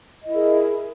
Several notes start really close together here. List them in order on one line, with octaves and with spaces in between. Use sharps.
D#5 E4 A#4 G#4